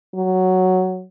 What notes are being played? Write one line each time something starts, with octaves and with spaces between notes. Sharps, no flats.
F#3